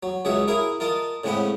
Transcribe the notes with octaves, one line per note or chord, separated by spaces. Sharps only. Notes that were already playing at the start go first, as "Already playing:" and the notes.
F#3
C#2 F#3 G#4 E5 F#5
E4 G#4 A#4 E5 F5
F4 A#4 D#5 A5
A2 C#3 G#3 C4 F#5 B5